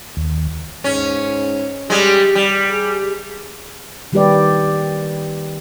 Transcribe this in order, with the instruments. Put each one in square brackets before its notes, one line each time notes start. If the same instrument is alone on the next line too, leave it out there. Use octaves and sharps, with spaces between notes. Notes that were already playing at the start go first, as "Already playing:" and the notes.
[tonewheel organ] D#2
[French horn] G#2 [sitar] C#4
[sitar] G3 G#3 [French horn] G4
[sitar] G3
[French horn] G#4
[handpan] D#3 G3 A#3 G4 B4 D5